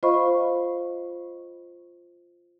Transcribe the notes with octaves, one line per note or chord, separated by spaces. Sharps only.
F4 C5 D#5 F5 B5 C#6